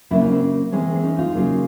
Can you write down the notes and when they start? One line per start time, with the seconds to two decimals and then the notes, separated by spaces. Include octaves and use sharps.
0.11 C#3 F#3 A#3 D4 E4
0.20 C#4 D#4
0.32 C4 D4
0.72 E3 G#3 C4 C#4
0.82 C4
0.92 C4 D4
1.03 C#4 D#4
1.18 D#4 F4
1.35 C#3 F#3 A#3